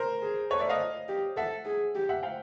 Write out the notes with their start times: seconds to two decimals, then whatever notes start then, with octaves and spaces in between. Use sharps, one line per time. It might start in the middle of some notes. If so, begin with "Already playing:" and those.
Already playing: A#4 C5
0.22 G#4
0.50 A4 B4 C#5
0.59 D5 E5
0.69 D#5 F5
1.08 G4
1.36 A4 E5 F#5
1.65 G#4
1.95 G4
2.09 E5 F#5
2.23 F5 G5